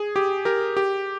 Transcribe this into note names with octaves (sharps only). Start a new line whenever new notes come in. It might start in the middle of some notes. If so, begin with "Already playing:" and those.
Already playing: G#4
G4
G4 A#4
G4